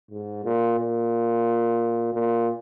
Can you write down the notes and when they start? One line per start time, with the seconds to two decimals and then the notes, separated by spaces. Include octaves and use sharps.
0.11 G#2
0.45 A#2
0.79 A#2
2.13 A#2